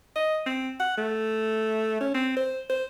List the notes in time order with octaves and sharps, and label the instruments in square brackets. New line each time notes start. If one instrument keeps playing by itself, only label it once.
[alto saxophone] D#5
C4
F#5
A3
C#4
C4
C5
C5